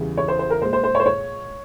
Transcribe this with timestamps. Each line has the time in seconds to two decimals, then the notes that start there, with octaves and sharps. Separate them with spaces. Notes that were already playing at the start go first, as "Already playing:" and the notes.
Already playing: E2 C#3 E3 G3
0.17 C#5
0.28 C5
0.39 C5
0.50 A#4
0.61 A#2 G#3 C5
0.73 C5
0.84 C5
0.95 C#5
1.00 C5
1.06 C#5